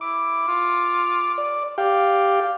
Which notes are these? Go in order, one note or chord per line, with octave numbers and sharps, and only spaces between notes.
E4 D6
F4
D5
G4 D5 F5 G5